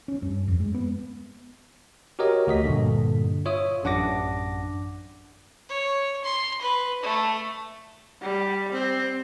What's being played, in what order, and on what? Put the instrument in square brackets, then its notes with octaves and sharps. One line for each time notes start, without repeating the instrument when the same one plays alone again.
[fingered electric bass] C#4
G2
F2
G#3
B3
[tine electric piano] F#4 G4 A#4 C#5 D#5
D2 F#4 D#5 B6
G2 A#2 D3
F4 C#5 E5 D#6
A1 F#2 D4 F#5 D6 A#6
[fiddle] C#5
C6
B4
A3
[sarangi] G3
C4